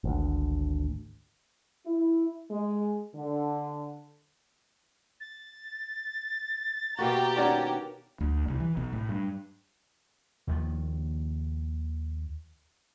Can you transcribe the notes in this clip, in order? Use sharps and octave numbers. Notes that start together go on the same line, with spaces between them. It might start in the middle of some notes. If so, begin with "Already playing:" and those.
G#1 D2
E4
G#3
D3
A6
B2 A#3 F#4 G4 A#5
D#3 C#4 D4 F#4 D5
D2
C2
E3
B1
A2
G2
D#2 D#3 F3